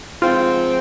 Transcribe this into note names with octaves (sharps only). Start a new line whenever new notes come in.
G#2 F3 C4 F4